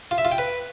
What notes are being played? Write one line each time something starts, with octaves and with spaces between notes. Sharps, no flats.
F4
E5
F4
G5
B4